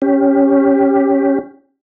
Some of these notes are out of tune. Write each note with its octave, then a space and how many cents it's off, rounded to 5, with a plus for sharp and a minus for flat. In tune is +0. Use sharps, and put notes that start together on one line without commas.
C#4 +0 G4 +0